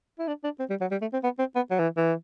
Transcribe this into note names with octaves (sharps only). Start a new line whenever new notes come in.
E4
D4
D4
C4
G3
F#3
G3
A3
C4
B3
C4
B3
F#3
E3
E3